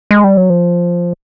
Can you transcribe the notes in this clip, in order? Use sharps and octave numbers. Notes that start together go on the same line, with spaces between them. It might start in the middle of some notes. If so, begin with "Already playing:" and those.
G#3
G3
F#3
F3